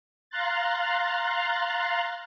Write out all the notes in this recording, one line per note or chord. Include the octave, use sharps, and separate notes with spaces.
F5 A#5 C6 F#6 A6